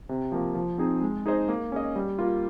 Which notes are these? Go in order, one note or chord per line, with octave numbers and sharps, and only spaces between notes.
C3
F3 A#3
F3
C4 D#4 G#4
G#3
D#4 G#4 C5 D#5
A#3
C#4 G#4 D#5
G3
A#3 F4